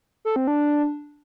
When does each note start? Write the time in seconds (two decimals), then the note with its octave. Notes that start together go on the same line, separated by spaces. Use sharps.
0.25 A4
0.36 C4
0.47 D4